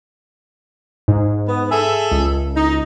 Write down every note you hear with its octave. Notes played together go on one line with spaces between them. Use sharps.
G#2
B3
G#4 A4 E5
C#2
D#4